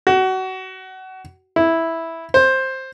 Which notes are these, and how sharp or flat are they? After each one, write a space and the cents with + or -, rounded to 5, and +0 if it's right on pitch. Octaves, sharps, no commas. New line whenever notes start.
F#4 +25
E4 -5
C5 +10